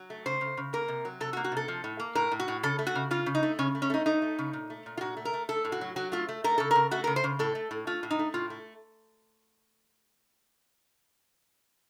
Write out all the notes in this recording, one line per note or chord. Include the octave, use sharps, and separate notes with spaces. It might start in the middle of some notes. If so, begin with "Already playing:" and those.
Already playing: F#3
A3
C#3 C5
C#3
C#3
A#3 A#4
C3
F#3
C3 A4
F#4
A#3
F#4
C3 A4
F3
A2
A#3
A2 A#4
A2
F#4
A2
C#3 A4
A3
F#4
C#3
C#3 F4
C#3
D#4
A3
C#3 C#4
A3
C#4
A3 D#4
A3 D#4
A3
C#3
A#2
A3
A#2
F4
A#2 F#4
A3
A#4
A3
A3 A4
A2
F#4
F#3
F#3 F#4
A3 F4
A3
A3 A#4
C#3 A4
C#3 A#4
A3 F#4
A#4
C#3
C5
C#3
A2 A4
A3
A2
A3 F4
A2
D#4
A3
A2 F4
A3